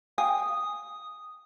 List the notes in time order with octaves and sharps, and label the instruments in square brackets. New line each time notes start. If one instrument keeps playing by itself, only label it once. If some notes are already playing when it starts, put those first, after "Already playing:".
[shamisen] F5 G5 G#5 [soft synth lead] D#6